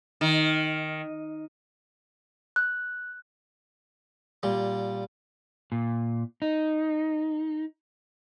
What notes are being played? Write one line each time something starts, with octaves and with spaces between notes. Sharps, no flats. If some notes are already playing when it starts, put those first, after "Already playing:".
D#3
F#6
A#2 G3
A#2
D#4